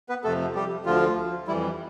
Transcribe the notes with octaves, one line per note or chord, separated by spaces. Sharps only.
B3 B4
F2 C3 F3 A3 A4
G3 G4
D2 D3 F3 F4
F2 E3 G3 E4